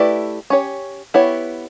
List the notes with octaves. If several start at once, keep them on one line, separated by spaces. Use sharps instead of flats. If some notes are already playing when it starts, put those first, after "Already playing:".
Already playing: A3 E4 G4 B4 D5
C#4 G4 C#5
B3 E4 G4 C#5